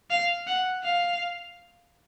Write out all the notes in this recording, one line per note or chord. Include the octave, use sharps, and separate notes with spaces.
F5
F#5
F5